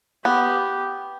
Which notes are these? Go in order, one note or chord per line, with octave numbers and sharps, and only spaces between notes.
B3 G4